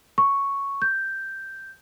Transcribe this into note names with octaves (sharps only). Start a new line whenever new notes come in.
C#6
G6